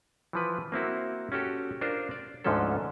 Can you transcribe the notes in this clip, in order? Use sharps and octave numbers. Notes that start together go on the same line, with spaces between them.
E3 F3 B4
A#3 C4 E4 F#4
C#4 F#4 G4 A4
D4 F4 A#4 C5
D5
D2 G#2 D3 F3 C#4 A4